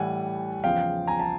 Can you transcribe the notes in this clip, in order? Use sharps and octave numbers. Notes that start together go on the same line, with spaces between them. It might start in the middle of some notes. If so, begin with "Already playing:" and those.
Already playing: A2 E3 G3 F#5 G#5
E2 C#3 F3 F5 G5
G#5 A#5
A5